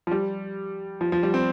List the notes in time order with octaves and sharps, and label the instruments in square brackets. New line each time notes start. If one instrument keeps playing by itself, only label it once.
[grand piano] F3
G3
F3
F3
G3
C4